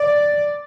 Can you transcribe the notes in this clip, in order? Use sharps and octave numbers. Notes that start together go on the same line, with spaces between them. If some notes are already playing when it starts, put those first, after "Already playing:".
Already playing: D5